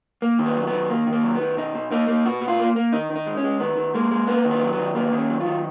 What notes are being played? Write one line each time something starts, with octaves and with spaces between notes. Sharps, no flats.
A#3
D#3
B3
F#3
B3
D#3
A#3
D#3
A#3
F#3
B3
D#3
B2 D#4
B2
A#3 D#4
A#3
B2 F#4
B2
F4
A#3
A#3
D#3 D#4
D#3
D#4
G#3
C#4
G#3
D#3 B3
D#3
G#3 A#3
G#3
A#3 B3
D#3
B3
F#3
B3
D#3
A#3 B3
D#3 C#4
F#3
F4
D#3